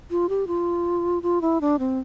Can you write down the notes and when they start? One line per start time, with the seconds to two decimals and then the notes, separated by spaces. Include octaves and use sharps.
0.11 F4
0.29 G4
0.47 F4
1.23 F4
1.42 E4
1.61 D4
1.79 C4